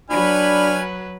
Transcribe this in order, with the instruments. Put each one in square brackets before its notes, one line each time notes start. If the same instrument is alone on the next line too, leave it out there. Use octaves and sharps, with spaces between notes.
[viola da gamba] F#3 B4 [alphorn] D4 [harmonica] G#5 B5 F6